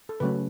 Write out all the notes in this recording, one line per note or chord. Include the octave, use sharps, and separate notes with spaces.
A4
C#3 F#3 A3 C#4 B4